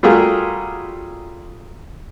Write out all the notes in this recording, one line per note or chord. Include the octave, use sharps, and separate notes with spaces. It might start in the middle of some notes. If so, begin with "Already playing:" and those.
G3 A3 F4 F#4 G#4 A#4